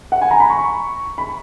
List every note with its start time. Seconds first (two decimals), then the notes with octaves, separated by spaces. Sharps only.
0.12 F#5
0.22 G#5
0.31 A#5
0.40 B5
0.50 C#6
1.18 B5